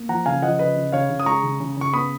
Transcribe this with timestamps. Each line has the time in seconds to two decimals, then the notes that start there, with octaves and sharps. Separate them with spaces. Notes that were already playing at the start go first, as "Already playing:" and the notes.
Already playing: A#3
0.09 F3 F#5 A#5
0.26 C#3 F5 G#5
0.42 F3 D#5 F#5
0.59 C#3 B4 D#5
0.76 C#3
0.92 C#3 C#5 F5
1.10 C#3
1.20 D#6
1.26 G#3 A#5 C#6
1.43 C#3
1.60 C#3
1.77 C#3 C#6
1.93 B3 B5 D#6